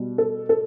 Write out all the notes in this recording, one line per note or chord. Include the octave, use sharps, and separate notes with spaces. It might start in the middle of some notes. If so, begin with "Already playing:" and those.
Already playing: B2 G3
A4
A4